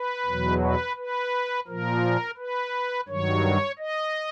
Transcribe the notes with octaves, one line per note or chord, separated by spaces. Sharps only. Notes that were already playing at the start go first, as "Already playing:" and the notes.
Already playing: B4
E2 B2 F#3
B4
B4
A#2 F3 A#4
B4
G2 D#3 F#3 C#5
D#5